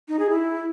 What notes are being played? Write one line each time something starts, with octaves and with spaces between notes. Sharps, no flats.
D#4
G#4
E4